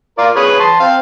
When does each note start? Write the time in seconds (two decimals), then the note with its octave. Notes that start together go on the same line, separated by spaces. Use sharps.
0.18 F4 A#4 D5
0.36 G#4 B4 C#5
0.60 A5 C6
0.80 C4 F5